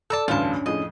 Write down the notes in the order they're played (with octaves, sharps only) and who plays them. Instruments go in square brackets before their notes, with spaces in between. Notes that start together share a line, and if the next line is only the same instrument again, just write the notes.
[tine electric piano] A4 D5 [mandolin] A5 A#5 E6
[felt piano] A1 D2 G2 [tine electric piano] C#4 D4 [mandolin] F4 A5
[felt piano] F2 A2 G#4 [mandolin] D#5